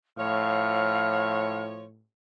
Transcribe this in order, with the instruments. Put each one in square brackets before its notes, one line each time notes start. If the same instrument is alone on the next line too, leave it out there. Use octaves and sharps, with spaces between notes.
[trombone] A2 [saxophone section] F3 C#5 [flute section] F5 F6